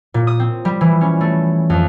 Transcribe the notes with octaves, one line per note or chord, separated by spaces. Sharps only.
A#2
D#6
C4
G3
E3
C#4
A3
F2